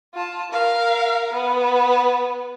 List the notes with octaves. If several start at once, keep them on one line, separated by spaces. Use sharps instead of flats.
F4 A5
A#4 F5
B3